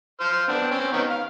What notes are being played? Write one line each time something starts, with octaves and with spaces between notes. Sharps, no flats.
C5 F6
B3 C4 D4
C4 C#4
D#3 B3 C#4
F5